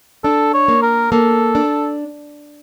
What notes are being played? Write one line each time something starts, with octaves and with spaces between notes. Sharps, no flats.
D4 A4
C#5
A#3
A#4
A#3 A4
D4